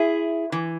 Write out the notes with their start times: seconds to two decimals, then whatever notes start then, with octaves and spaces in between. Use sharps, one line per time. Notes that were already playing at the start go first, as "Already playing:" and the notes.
Already playing: E4 G#4
0.52 E3